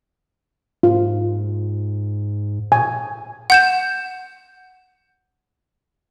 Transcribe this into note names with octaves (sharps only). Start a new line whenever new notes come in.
G#2 F4
A#2 G#5
F#5 G6 E7